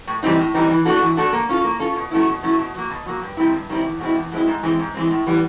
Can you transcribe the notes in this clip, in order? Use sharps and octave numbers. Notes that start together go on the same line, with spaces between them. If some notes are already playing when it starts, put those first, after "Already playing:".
A2
E3 G3 C4 D#4
A2
E3 G3 C4 D#4
E3
A3 D4 F#4 A4
E3
A3 D4 F#4 A4
A#3
C#4 F4 A4
A#3
C#4 F4 A4
B2
F#3 A3 C#4 E4
B2
F#3 A3 C#4 E4
B2
F#3 A#3
B2
F#3 A#3
G2
D#3 G3 C4 E4
G2
D#3 G3 C4 E4
E2
B2 G#3 C4 E4
E2
B2 G#3 C4 E4
G#2
E3 G#3 C4
G#2
E3 G#3 C4
A2
E3 G3 B3